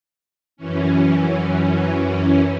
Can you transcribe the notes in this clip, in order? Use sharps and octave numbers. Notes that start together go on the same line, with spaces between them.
F#2 E3 C#4